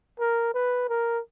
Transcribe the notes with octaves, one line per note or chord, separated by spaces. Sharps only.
A#4
B4
A#4